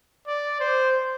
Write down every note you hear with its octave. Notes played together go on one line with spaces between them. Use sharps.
D5
C5